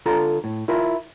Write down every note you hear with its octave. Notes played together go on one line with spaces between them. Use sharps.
D3 F4 A4 A#5
A2
E4 F4 A#4